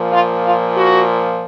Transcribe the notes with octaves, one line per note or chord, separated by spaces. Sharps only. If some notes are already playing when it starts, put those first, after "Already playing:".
Already playing: A#2 F3
F4
F4
F#4